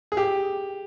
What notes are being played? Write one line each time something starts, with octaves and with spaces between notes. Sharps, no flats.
G#4
G4